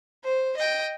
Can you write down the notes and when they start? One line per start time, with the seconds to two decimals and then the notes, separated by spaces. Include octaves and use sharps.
0.24 C5
0.57 D#5 G5